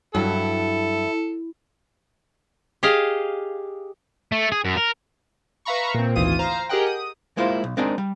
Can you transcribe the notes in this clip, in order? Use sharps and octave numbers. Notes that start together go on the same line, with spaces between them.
G2 F#3 E4 A4
G4 G#4 D#5 F5
A3
G#4
F#2
A#4
B4 E5 F5 A#5 B5 C#6
A#2 C4
G#1 D2 E3 F4 D#6 D#7
C5 F5 A#5
G4 G#4 A#4 D#5 F#5 G5
D#6
G#3 A#3 E4 F4 B4 C5
B1
G#3 C4 D4 D#4 G#4 A#4
G3